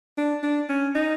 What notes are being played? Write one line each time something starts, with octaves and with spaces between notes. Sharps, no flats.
D4
D4
C#4
D#4